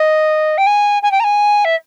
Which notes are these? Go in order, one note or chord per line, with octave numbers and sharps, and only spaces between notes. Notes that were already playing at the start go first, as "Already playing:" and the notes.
Already playing: D#5
G5
G#5
G#5
G5
A#5
G#5
E5